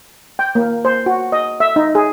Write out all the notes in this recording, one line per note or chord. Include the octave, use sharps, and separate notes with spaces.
G5
A#3
C5
F#4
D#5
E5
D#4
G#4